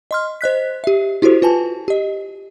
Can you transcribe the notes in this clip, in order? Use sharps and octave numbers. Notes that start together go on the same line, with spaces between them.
D#5 C6 F6
C5 D#5 F#6 B6
G4 E5
E4 F#4 G4 A4 C5
F4 B4 G#5 A5
G4 D#5